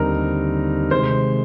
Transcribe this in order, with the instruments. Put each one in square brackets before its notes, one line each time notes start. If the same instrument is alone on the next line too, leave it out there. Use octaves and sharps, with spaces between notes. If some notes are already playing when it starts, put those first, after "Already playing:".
Already playing: [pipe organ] D#2 D3 G3 C4 D#4 [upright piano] A#4
[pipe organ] C3 D#3 G#3 [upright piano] C5